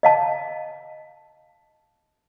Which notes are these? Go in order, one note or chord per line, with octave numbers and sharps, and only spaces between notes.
D#5 F5 A5